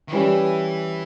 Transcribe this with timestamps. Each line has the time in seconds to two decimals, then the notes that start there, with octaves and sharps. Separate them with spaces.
0.08 D#3
0.12 E3 G3 C#4 E4 G4 B4